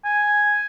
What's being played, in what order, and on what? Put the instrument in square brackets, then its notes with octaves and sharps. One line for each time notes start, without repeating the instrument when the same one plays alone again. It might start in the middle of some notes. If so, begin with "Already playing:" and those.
[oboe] G#5